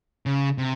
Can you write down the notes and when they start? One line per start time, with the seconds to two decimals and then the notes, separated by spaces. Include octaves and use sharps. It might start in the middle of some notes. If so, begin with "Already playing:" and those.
0.26 C#3
0.58 C3